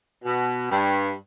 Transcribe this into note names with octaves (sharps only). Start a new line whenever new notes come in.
B2
G2